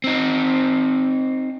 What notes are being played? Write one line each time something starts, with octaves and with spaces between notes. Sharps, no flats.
C4 D#4